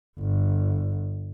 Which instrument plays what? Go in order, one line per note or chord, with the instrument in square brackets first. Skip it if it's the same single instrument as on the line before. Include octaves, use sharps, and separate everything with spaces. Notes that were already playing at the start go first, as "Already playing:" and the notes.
[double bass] G1